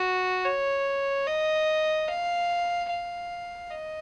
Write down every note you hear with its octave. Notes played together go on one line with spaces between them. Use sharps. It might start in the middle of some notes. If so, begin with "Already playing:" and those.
Already playing: F#4
C#5
D#5
F5
F5
D#5